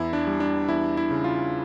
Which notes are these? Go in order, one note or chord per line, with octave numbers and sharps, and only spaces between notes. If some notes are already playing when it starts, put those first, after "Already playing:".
Already playing: E2 E4
D4
G3
D4
E2 E4
E4
C#3
F4